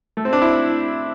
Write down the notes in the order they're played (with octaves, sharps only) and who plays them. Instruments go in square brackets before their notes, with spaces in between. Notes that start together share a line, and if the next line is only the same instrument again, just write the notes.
[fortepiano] A3
C4
D4
E4